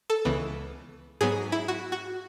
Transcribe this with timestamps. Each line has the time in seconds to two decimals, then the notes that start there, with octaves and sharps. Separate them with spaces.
0.10 A4
0.25 C#2 C#3 E3 B3
1.21 G#2 F#3 B3 G#4
1.52 E4
1.68 F#4
1.92 F#4